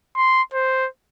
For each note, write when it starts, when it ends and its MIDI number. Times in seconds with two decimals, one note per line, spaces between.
0.16 0.42 84
0.53 0.87 72